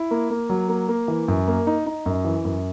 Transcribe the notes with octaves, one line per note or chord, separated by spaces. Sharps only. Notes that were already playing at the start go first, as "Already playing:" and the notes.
Already playing: E4
A#3
A#3
F#3
A#3
A#3
E3
F#2
A#3
D#4
D#4
F#2
E3
F#2